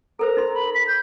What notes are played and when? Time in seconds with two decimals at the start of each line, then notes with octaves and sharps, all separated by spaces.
0.19 A4 A#4 C5 A#5
0.37 D#4 C6
0.54 B5
0.75 B6
0.88 G6